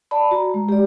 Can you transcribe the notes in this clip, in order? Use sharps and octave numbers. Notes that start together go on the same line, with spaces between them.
D5 A5 B5
F#4 A#5
G#3
G4 D5